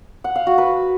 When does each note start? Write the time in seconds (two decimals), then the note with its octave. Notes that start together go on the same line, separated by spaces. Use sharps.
0.24 F#5
0.36 F5
0.47 F#4
0.58 B4